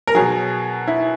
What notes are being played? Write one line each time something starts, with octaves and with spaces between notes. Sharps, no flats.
A#4
B2 F#3 G#4
E4